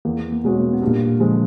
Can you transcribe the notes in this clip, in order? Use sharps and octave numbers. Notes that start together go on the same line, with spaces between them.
E2 A#3
B3
A#3
B2 G#3 B3 C#4 F#4
A#3
B3
G2
A#2 A#3
D3 F3 G#3